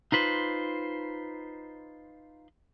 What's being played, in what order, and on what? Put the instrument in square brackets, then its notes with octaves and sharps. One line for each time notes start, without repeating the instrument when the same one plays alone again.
[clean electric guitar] D#4 F4 B4 C5